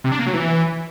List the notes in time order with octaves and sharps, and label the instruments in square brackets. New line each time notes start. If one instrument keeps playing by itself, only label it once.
[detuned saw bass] C3
D4
A#3
F#3
E3